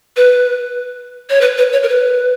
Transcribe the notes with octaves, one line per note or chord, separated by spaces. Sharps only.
B4
C#5
B4
B4
C#5
A#4
B4